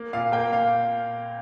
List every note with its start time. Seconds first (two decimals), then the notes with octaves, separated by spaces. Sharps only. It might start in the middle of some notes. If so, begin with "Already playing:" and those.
Already playing: A#3
0.13 A#2 F5
0.32 A#3 G5
0.52 A#2 F5